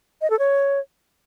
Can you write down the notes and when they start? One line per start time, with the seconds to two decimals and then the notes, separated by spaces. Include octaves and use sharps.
0.22 D#5
0.30 A4
0.39 C#5